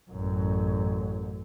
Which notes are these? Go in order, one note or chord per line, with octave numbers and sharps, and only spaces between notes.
A1 F#2